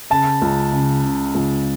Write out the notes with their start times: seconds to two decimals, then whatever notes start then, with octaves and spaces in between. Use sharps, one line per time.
0.10 C#3 A5
0.42 C#2
0.72 C#3
1.04 C#3
1.35 C#2